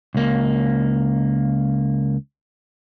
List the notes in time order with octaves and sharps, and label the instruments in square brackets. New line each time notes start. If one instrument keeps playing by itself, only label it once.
[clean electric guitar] C#2 A#3